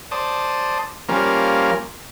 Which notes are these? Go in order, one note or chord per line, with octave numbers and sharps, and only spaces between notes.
C5 D5 A5 D#6
F3 G3 A#3 C#4 A#4